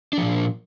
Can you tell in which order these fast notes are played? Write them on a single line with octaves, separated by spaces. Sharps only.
D4 F3 A#2